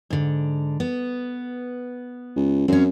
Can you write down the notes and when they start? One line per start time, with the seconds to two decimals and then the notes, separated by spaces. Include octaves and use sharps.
0.10 G#2 D3
0.80 B3
2.36 C#2
2.68 F#2 C4 C#4